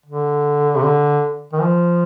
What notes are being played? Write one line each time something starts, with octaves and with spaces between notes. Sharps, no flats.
D3
C3
D3
D#3
F3